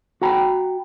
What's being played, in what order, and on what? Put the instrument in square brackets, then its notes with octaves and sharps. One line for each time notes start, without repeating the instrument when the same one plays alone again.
[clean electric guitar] F#4 G5 A#5 B5